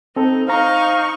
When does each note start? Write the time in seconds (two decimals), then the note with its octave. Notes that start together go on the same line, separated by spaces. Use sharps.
0.16 C4 D#4 A4
0.48 D#4 C5 F5 A#5 C#6